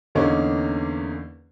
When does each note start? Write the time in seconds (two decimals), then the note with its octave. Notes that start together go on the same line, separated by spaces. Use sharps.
0.15 E2 D3 A#3 C#4 D#4